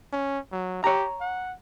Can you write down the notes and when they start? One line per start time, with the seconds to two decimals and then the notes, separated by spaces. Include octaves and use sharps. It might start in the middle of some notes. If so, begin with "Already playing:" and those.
0.13 C#4
0.52 F#3
0.84 G4 C#5 A#5
1.21 F#5